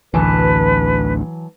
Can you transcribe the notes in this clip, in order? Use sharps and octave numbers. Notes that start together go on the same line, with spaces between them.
A1 D2 E3 F#3 B4 A5